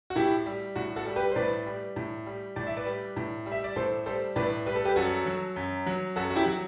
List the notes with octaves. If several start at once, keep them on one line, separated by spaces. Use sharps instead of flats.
F#4
A2 E4 G4
G3
A2 F#4
F#4 A4
G3
G4 B4
C5
A2 B4 D5
G3
A2
G3
A2 D5
E5
B4 D5
G3
A2
G3
E5
D5
A2 A4 C5
G3 A4 C5
A2 B4 D5
G3 B4
A4
G4 B4
F#2 F#4 A4
F#3
F#2
F#3
F#2 F#4 A4
F#4
E4 G4
F#3